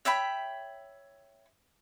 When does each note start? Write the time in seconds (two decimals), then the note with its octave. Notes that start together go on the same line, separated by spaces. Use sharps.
0.05 C#5 E5 G5 B5